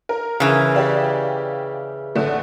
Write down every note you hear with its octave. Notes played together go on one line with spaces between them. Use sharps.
A#4
C#3 E3
G4 D5 F5
A1 D3 A3